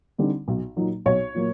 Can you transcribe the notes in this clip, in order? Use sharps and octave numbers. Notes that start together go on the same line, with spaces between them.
D3 G3 C4 D#4
B1
A#2 F#3 A#3 D#4
B1 C#5
A#2 F#3 A#3